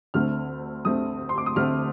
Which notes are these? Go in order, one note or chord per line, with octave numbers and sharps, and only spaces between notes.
D2 D3 A3 C4 F6
D2 D3 A3 C4 D#6
C6
D6
D#6
D2 D3 A3 C4 F6